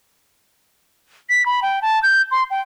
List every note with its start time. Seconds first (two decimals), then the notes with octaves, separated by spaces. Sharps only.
1.30 B6
1.46 B5
1.62 G5
1.82 A5
2.03 G6
2.31 C6
2.51 G5